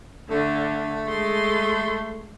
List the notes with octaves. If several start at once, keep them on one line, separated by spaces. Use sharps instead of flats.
D3 A3
G#3 C6